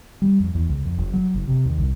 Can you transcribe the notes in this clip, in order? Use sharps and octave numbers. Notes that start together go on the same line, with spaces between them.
G3
F2
E2
C#2
F2
F#1
F#3
F#1
C3
D#2
C2